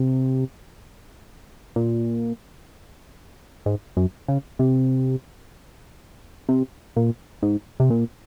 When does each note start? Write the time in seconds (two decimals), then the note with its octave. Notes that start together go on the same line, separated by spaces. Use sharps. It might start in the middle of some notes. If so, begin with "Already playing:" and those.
Already playing: C3
1.76 A#2
3.66 G#2
3.97 F#2
4.28 C#3
4.59 C3
6.49 C3
6.96 A#2
7.42 G#2
7.80 C3
7.90 A#2